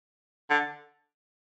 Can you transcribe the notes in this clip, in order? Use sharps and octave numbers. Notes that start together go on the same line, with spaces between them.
D3